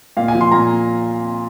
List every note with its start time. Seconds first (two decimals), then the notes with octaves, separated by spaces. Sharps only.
0.17 A#2 F5
0.28 G#5
0.35 F3
0.41 C6
0.51 A#2 A#5